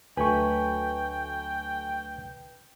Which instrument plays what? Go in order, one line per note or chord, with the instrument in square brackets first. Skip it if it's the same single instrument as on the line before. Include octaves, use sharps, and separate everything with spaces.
[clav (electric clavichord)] D2 F#3 A3 [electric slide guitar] B4 [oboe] G5 [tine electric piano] G#5 C#6